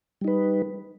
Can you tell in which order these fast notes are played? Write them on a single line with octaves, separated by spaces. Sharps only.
G3 D#4 B4